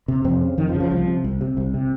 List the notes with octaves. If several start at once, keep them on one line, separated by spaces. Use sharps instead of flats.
C3
F2 C3 C4
C#3
F2 D#3
F3
C#3
F3
C2 F3
C3
C2
C3
C2
C3